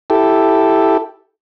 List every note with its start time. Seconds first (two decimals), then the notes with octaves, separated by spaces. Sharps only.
0.10 E4 G4 A4